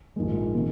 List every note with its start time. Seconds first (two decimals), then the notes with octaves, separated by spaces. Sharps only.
0.16 A#1 G#2 D#3 G#3
0.55 C3 D#3